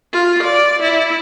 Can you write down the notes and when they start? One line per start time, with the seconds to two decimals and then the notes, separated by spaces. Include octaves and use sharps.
0.13 F4
0.43 D5
0.82 E4